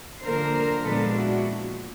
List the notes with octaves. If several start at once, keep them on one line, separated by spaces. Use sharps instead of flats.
D3 F3 A#3 D4 A#4 C5
A#2 F3 G#3 B3 D4 A4 B4
E4 F#4